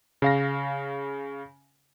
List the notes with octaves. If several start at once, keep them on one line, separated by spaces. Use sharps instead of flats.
C#3 F5 A#6